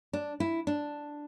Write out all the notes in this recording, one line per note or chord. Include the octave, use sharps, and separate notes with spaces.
D4
E4
D4